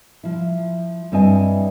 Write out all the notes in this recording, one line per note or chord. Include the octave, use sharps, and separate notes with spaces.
F3 E4
G2 C4 E4 D#5 G#5